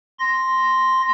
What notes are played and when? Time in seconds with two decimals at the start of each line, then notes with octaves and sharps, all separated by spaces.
0.19 C6 A#6